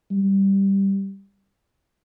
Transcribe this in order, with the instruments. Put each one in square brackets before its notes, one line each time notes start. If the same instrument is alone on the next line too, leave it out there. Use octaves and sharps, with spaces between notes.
[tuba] G3